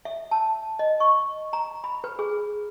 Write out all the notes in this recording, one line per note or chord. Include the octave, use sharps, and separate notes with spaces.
E5
A5
D#5
C#6
A#5
B5
B4
G#4